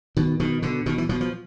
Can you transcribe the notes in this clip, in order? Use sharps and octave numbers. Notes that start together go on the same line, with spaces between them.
B2 D#3
B2 D#3
B2 D3
B2 D#3
E3
B2 F3
F3